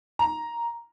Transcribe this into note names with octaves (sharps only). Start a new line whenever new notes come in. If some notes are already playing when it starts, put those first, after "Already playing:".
A#5